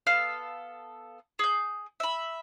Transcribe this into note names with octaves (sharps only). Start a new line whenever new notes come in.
B3 A4 F5 F6
G#4 G6
E5 B5